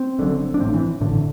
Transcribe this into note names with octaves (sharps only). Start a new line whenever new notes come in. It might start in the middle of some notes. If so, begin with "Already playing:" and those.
Already playing: C4
F#1 F#2 D3
D4
A1 A2 C4
E3
A1 A2 D3